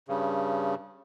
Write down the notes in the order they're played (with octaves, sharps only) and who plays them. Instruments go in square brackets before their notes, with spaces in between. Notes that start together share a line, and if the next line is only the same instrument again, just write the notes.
[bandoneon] G2 C#3